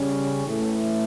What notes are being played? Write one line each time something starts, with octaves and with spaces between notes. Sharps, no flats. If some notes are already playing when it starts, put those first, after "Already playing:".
Already playing: C#3 G3 C#4
A2 E3 A3 E4